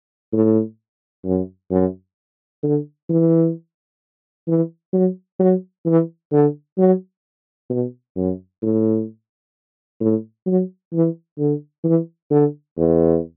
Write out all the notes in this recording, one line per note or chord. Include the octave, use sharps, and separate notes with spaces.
A2
F#2
F#2
D3
E3
E3
F#3
F#3
E3
D3
F#3
B2
F#2
A2
A2
F#3
E3
D3
E3
D3
E2